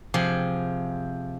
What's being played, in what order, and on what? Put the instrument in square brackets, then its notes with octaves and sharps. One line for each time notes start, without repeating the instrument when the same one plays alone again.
[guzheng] C3 F3 G#4